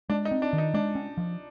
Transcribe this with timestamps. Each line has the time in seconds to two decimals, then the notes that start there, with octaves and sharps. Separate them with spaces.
0.09 G#3 D4
0.25 D#4
0.31 C4
0.42 D4
0.53 D#3
0.58 D#4
0.74 G#3 D4
0.95 C#4
1.17 F3